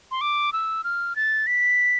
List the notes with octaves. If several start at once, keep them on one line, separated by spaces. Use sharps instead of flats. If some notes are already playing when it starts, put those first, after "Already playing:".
C6
D6
E6
F6
A6
B6